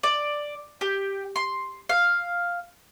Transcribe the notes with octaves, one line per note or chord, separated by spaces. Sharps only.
D5
G4
C6
F5